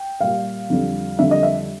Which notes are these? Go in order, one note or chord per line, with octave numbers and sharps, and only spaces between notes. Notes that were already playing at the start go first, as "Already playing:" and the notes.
Already playing: G5
A#2 G3 F5
F2 D3 G3
F2 D3 G3 E5
D#5
E5